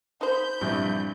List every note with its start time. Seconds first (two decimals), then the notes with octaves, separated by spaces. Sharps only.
0.21 D#4 C5 B5 G6
0.61 A#1 G2 C3 E3